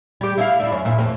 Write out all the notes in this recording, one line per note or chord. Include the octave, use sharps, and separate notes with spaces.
G3 G4
E4 D#5 F5
D4 E4
F#2
A#2 E4
F2